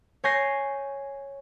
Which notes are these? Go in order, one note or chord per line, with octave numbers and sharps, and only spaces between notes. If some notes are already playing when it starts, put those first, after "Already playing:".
C#5 G#5 G6 A#6 C7